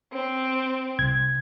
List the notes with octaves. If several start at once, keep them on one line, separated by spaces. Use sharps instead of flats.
C4
C2 G#6